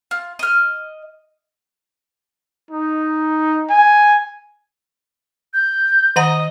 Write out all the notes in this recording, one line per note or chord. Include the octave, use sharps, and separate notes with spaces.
F4
D#5 F6
D#4
G#5
G6
D#3 D#5 F#5 A#5